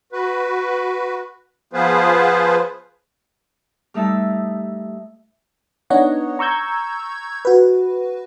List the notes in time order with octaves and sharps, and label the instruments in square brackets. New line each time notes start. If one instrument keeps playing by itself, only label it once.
[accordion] F#4 B4
F3 B3 F4 G#4 B4 C5
[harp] G3 A3 D#4 E5 A5
[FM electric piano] B3 D4 D#4 C#5 D#5 F#5
A#5 C#6 E6 G6 G#6
F#4 B4